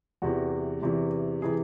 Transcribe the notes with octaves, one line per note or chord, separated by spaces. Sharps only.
E2 C3 E3 F#4
E2 C3 E3
C3 E3 G#4